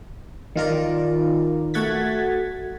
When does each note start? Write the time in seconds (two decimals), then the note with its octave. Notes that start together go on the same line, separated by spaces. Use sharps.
0.56 D#3 F4 A#4 D5
1.74 A3 F#4 F#5 G#6 A6 B6